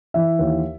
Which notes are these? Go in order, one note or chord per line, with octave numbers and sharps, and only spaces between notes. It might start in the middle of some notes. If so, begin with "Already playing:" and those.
E3 E5
D#2